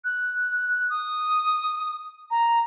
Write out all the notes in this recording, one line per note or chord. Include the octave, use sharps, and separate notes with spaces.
F#6
D#6
A#5